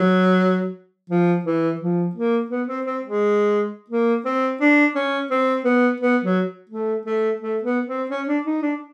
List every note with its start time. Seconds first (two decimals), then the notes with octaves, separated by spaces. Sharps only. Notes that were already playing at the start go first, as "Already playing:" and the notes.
Already playing: F#3
1.10 F3
1.45 E3
1.81 F3
2.15 A#3
2.51 B3
2.68 C4
2.85 C4
3.03 G#3
3.90 A#3
4.25 C4
4.61 D4
4.95 C#4
5.31 C4
5.65 B3
6.00 B3
6.24 F#3
6.70 A3
7.06 A3
7.40 A3
7.63 B3
7.87 C4
8.10 C#4
8.28 D4
8.46 D#4
8.62 D4